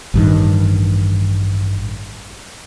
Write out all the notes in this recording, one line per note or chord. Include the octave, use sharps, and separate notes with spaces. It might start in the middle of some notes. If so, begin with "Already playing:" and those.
A1 G2 D#3